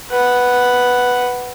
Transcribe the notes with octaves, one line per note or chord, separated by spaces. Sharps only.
B4 F#5